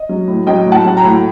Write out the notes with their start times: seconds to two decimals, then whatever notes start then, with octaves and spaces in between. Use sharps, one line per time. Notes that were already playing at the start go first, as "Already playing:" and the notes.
Already playing: D#5
0.09 F#3
0.28 A2
0.47 F#3 D#5 G5
0.66 A2
0.72 F#5 A5
0.84 F#3
0.97 G5 A#5
1.04 A2